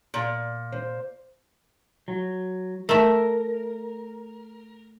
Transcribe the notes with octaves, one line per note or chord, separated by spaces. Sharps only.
A#2
C5
F#3
A3 A#4 E5